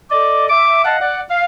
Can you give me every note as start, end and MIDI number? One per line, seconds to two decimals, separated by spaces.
0.11 0.49 69
0.11 0.49 74
0.11 0.49 75
0.11 0.49 86
0.50 0.82 76
0.50 0.82 86
0.85 0.96 75
0.85 0.96 77
0.85 0.96 78
0.85 0.96 81
1.01 1.20 74
1.01 1.20 78
1.30 1.45 77